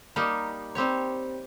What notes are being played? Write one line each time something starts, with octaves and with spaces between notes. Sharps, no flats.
G3 A#3 D#4 G4
G3 C4 G4 C#5